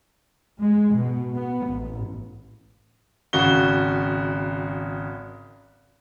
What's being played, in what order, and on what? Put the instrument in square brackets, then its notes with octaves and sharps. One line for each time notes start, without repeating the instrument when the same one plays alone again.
[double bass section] G#3
B2
B3
A1
[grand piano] G#1 C#3 F#4 G7